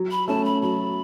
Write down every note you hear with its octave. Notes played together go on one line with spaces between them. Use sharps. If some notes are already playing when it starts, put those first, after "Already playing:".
Already playing: F#3
B5
A3 C#4 A4 A5
B5
F#3 B5